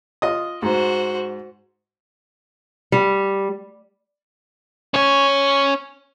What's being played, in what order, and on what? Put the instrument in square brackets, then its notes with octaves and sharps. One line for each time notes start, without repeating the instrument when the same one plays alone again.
[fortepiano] F4 D#5 D#6
[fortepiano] G#2 [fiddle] F#4 C5
[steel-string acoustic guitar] G3
[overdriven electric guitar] C#4 C#5